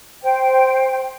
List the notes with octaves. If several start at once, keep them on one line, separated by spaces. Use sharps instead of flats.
C5 G5